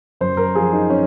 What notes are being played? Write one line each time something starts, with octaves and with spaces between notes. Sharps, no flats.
F#2 C5
A#4
F3 G#4
D#4
C#4